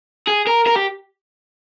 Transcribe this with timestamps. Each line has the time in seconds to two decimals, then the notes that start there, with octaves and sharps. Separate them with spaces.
0.28 G#4
0.47 A#4
0.66 A#4
0.75 G4